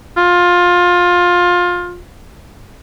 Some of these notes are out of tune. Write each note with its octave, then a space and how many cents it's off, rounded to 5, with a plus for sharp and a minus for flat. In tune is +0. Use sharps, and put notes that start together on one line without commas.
F4 +20